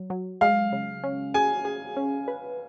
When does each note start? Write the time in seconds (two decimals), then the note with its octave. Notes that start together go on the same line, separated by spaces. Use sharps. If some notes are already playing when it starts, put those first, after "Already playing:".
Already playing: F#3
0.10 F#3
0.41 G#3 F5
0.72 C#3
1.03 C#4
1.34 G#4 G#5
1.65 G#4
1.97 C#4
2.28 B4